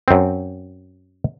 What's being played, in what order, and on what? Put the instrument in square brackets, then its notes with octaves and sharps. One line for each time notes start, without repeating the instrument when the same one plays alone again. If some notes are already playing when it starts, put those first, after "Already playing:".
[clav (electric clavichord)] F#2 C4